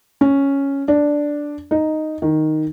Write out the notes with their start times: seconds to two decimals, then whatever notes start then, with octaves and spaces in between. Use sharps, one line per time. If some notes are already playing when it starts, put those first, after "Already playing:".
0.21 C#4
0.88 D4
1.71 D#4
2.22 D#3